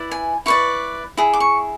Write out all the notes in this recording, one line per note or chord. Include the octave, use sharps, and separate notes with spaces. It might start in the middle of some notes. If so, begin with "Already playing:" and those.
Already playing: E4 B4 D5
G#5
E4 B4 D5 C#6
E4 G#4
D6
C#6